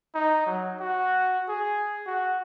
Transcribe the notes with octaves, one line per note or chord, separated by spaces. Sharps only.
D#4
F#3
F#4
G#4
F#4